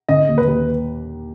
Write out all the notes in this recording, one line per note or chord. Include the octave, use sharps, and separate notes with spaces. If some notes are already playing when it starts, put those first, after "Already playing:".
D3 D#5
D#2
B4
D#2